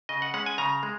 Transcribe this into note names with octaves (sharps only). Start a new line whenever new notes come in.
C#3 D#5
F#5
G#3 C#4 F#5
G#5
C#3 A#5
G#3